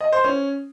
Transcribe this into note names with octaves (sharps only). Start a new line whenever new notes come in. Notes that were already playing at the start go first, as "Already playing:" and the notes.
D#5
C5
C#4